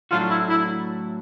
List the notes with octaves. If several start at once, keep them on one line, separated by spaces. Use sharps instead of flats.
A2 F#3 A3 D4 F4 F#4
E4
E4